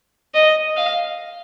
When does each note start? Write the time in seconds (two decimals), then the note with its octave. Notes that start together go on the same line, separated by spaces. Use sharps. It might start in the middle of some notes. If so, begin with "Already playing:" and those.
0.34 D#5
0.77 F5